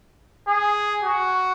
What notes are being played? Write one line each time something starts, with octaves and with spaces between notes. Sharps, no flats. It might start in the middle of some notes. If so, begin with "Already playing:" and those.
G#4
F#4